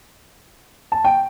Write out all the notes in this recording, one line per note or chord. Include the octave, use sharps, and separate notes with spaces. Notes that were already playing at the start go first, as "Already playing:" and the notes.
A5
G5